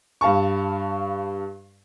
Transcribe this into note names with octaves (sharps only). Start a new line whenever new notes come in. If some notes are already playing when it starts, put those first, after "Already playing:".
G2 F5 A5 C#6